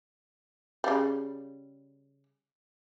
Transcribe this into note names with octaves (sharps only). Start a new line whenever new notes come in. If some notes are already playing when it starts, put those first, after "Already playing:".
C#3 G3